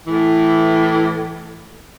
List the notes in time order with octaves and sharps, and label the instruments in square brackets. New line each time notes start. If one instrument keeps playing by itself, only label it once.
[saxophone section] A2 E3